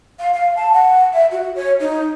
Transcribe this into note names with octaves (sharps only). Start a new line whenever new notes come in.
F5
F5
A5
F#5
E5
F#4
C#5
D#4